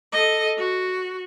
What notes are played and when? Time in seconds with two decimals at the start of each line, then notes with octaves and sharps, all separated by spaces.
0.12 A4 D#5
0.57 F#4